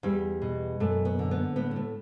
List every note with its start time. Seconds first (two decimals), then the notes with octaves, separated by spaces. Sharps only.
0.03 E2 G3
0.42 B2
0.80 F#2 A3
1.05 B3
1.19 D3
1.31 B3
1.56 A2 B3
1.71 B3
1.76 A3